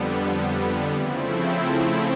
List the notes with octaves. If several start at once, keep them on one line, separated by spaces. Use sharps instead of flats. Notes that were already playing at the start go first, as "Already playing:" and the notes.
Already playing: F2 D3 G3 B3
C#3 F3 A3 C4 E4